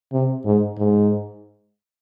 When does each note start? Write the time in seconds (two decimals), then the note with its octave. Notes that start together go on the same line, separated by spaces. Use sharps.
0.12 C3
0.45 G#2
0.78 G#2